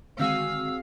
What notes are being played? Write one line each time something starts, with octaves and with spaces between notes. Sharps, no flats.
D3 D#3 G#3 C4 F#4 G#4 F5 E6